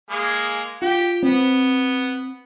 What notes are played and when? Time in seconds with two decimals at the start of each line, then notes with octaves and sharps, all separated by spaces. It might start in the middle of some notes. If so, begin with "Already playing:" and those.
0.10 G#3 A#3 G#4
0.82 F4 G4
1.23 B3 C4